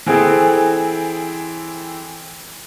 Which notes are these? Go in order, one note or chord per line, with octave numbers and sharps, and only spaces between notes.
E3 C4 G#4 A4